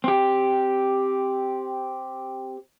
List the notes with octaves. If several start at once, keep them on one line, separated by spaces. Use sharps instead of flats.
C4 G4